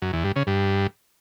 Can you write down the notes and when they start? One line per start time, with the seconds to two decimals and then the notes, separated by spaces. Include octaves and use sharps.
0.02 F#2
0.13 E2
0.24 G2
0.36 C#3
0.47 G2